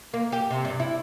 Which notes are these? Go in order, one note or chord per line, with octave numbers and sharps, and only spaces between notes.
A#3
G4
C3
G2
E4